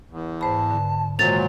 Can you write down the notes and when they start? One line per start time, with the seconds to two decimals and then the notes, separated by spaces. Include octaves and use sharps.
0.11 E2
0.41 G#2 C5 A5 B5
0.71 D3
1.19 A#2 D#3 E3 F#3 G#3 C5 A6 F7